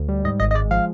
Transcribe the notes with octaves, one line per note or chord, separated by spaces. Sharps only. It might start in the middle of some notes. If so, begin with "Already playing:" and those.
Already playing: D2
G3
G#2 D#5
G#1 D#5
D#5
G#3 D5
F3 F5